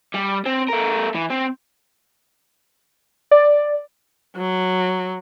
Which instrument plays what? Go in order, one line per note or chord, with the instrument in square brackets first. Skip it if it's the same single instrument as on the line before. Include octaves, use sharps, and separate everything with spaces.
[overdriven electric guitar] G3
C4
A3 A#4
E3
C4
[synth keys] D5
[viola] F#3